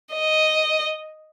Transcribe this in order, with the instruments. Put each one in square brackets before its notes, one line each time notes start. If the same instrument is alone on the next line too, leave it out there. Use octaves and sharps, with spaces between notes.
[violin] D#5